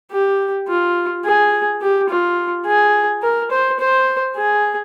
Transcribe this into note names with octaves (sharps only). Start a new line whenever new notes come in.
G4
F4
G#4
G4
F4
G#4
A#4
C5
C5
G#4